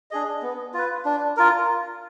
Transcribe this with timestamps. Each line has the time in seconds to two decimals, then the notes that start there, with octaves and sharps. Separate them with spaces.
0.11 D4 G#4 D#5
0.42 B3
0.74 F4 B4
1.05 D4
1.37 F4 A#4